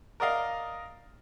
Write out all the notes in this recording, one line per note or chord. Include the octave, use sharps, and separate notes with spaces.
A#4 D5 D#5 F5